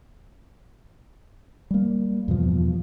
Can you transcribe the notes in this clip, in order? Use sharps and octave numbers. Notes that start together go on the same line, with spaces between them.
G3 A#3
E2 G2 B2 F3